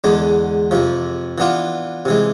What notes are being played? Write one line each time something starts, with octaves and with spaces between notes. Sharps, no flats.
E2 D3 G#3 D4
F2 C3 F3
E3 B3 D4 F4
C3 E3 G#3